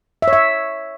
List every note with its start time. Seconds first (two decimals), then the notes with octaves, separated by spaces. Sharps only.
0.22 E5
0.28 C#5
0.33 E5